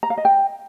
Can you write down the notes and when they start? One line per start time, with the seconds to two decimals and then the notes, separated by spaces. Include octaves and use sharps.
0.03 A#5
0.10 F5
0.17 D#5
0.25 G5